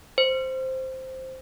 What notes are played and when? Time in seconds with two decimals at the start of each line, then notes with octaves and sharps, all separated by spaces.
0.18 C5